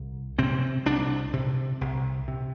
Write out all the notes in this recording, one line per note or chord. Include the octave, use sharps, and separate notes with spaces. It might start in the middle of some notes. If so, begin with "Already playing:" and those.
Already playing: C2
C3 C4
C2 D4
C3
C2
C3